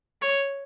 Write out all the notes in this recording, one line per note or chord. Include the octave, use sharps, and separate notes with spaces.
C#5